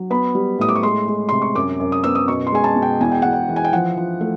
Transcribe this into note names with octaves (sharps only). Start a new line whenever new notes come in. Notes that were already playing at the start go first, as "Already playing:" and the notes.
Already playing: F#3
B3 B5
G3
A2 D#6
D6
C#6
G#3 C6
G#3
C3 C6
C#6
F#2 D6
F#2
D#6
B3 E6
D#6
B2 C#6
C6
G#3 G#5
A5
B2
G5
E2 G#5
G5
E2 F#5
G5
E3
G#5
G5
F3 F#5
F3
A3